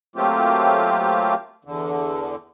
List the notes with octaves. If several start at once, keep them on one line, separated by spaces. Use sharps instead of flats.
F#3 A3 A#3 C4 F4 G4
E2 D3